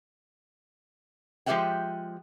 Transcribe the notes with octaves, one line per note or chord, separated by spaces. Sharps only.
F3 G#3 G4 E5 F#5 G5